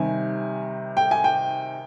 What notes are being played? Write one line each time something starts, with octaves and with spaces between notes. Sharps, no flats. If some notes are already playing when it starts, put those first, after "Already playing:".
Already playing: C3 D#3 G3 G#5
G5
G#5
G5